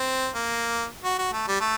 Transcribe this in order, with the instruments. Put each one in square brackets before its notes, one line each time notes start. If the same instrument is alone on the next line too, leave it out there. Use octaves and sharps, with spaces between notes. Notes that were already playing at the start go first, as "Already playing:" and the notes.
Already playing: [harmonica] C4
A#3
F#4
F#4
A3
G3
A3